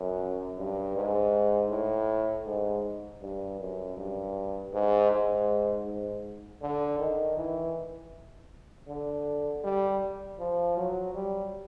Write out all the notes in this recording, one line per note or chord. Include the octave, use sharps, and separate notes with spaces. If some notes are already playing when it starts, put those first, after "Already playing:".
Already playing: F#2
G2
G#2
A2
G#2
G2
F#2
G2
G#2
G#2
G#2
D3
D#3
E3
D3
G3
F3
F#3
G3